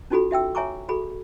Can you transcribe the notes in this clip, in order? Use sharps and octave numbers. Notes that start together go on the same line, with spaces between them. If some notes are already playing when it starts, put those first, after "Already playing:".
C#4 D#4 F4 F#4 A4 B5
F#4 E5 G5 E6
C#5 E5 G#5 A#5 C#6 D6
F#4 G#4 A4 B5